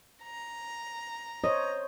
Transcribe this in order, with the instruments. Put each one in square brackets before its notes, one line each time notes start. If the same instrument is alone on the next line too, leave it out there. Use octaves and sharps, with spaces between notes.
[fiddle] A#5
[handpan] C5 C#5 [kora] D#5